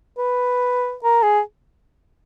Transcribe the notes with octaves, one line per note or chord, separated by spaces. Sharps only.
B4
A#4
G#4